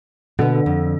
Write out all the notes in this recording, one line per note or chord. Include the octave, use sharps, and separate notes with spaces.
B2 D3 B3
F2